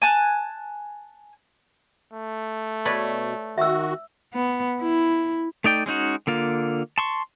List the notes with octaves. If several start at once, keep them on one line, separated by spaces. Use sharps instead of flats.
G#5 A5 F#6
A3
B2 B4 C#5 D5
D#3 F#4 E5 E6
B3
E4
A3 D#4 D5 G5
G#3 C#4 D#4 F#4
D3 A#3 F4
A5 C6 C#6